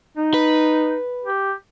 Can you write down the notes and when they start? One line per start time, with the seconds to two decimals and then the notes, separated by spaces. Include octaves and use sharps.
0.17 D#4
0.34 B4
1.25 G4